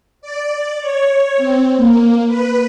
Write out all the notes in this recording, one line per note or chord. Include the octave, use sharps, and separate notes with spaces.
D5
C#5
C4
A#3
B4